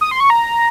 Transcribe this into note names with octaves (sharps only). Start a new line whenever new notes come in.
D#6
C6
C#6
A#5